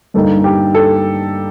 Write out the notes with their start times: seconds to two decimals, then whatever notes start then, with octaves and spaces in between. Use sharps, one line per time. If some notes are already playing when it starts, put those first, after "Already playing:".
0.14 G2 D3 G3 A#3 D#4 A4
0.44 G4
0.74 A4